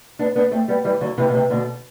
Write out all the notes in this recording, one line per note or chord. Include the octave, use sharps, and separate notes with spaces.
B3 D4
B3 D4
A3 C4
G3 B3
E3 G3
D3 F#3
C3 E3
B2
C3
B2 D3